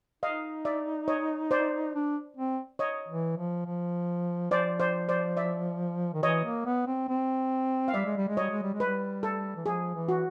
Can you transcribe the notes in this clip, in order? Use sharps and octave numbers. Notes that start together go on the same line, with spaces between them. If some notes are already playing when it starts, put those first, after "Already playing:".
D#4 D#5 F5
D5 E5
C#5 D#5
C5 D5
D4
C4
C#5 D#5
E3
F3
F3
F3 C5 D5
C5 D5
C5 D5
D5 E5
D#3
E3 C#5 D#5
A#3
B3
C4
C4
F5
G3 D5 E5
G#3
G3
G#3
G3 C#5 D#5
G#3
G3
G#3
G3 B4
A4
E3
F3 G#4
E3
F#4